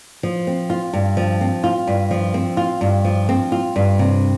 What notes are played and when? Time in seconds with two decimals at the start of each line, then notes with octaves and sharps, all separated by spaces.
0.23 F3
0.47 C4
0.70 F4
0.94 G2
1.17 F3
1.41 C4
1.64 F4
1.87 G2
2.11 F3
2.34 C4
2.57 F4
2.81 G2
3.05 F3
3.29 C4
3.52 F4
3.76 G2
3.99 C3